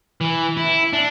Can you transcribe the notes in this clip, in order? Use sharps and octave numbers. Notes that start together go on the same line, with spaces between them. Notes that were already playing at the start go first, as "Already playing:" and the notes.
E3
E4
D4